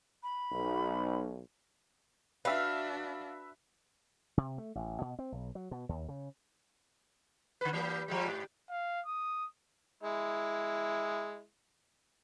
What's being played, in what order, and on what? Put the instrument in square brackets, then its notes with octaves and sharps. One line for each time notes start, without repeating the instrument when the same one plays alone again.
[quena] B5
[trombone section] B1
[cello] D4 F#4 [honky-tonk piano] B4 E5 [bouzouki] F5
[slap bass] C3
A3
A1
B2
C4
B1
F#3
B2
D#2
C#3
[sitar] D3 B4
E3 G3 A#3
F3 G3 G#3
G#2
[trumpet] F5
D#6
[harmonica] G#3 E4